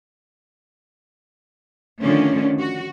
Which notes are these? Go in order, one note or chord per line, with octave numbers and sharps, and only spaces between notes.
D3 D#3 F3 A3 C#4 D4
F#4